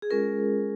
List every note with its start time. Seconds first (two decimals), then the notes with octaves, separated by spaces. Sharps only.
0.02 G#4
0.10 G#3 C#4 F4 A#4